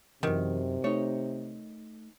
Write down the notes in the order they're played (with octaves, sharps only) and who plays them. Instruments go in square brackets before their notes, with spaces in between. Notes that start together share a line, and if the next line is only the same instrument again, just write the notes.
[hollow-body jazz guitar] C2 F#2 [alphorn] C3 [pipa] D#3 [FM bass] E3
[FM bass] A3 [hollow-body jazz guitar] D#4 C#5